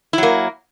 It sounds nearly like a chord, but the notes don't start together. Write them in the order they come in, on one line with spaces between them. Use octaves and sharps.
E4 F#3 A#3